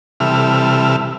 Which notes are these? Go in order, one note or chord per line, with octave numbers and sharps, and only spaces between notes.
C3 E3 G3 A4 E5 F6